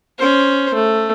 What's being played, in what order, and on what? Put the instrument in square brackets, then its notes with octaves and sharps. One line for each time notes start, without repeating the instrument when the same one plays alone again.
[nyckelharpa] C#4 C5
A3